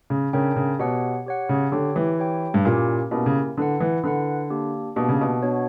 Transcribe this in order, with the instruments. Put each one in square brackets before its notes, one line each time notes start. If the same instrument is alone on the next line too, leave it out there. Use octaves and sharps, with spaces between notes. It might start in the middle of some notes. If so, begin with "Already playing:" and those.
[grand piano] C#3
[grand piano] C#3 [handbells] D4 A#4 C#5 G5
[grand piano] C#3
[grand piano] B2 [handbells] G4 C#5 F#5
[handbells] G4 C#5 F#5
[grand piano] C#3
[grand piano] D3 [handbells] G4 C#5 G5
[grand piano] E3
[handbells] G4 C#5 G5
[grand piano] G2
[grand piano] A#2 [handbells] A#3 C#4 E4 G4 A#4
[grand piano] B2 [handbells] A#3 C#4 E4 G4 A#4
[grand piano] C#3
[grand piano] D3 [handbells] E4 B4 F#5
[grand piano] E3
[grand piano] D3 [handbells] E4 B4 F#5
[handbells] A#3 D4 G4
[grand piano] B2 [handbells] A#3 D4 G4
[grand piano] C#3
B2
[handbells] B3 D4 F#4 C#5